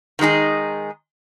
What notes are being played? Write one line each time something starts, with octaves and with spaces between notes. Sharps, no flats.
D#3 G#3 D#4 G#4